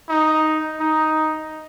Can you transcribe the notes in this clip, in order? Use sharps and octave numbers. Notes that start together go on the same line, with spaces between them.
D#4
D#4